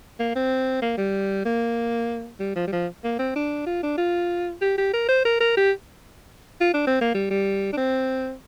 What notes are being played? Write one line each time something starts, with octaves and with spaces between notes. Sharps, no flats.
A#3
C4
A#3
G3
A#3
G3
F3
G3
F3
A#3
C4
D4
F4
D4
F4
G4
G4
A#4
C5
A#4
A#4
G4
F4
D4
C4
A#3
G3
G3
D4
C4